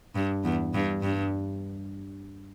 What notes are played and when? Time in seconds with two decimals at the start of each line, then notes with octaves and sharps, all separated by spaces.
0.15 G2
0.44 E2
0.74 G2
1.02 G2